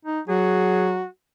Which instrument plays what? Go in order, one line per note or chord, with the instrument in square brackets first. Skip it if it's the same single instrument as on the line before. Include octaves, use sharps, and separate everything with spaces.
[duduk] D#4
[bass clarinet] F#3 [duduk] F#4 [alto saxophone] G#4